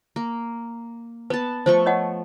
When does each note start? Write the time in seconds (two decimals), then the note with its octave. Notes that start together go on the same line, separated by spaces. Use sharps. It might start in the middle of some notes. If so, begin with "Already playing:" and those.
0.16 A#3
1.30 B3 B4 A5
1.66 F3 A3 C5 C#6
1.86 C#5 D#5 F#5